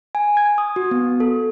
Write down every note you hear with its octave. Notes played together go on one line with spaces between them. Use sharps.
G#5
G#6
D#6
F#4
B3
A4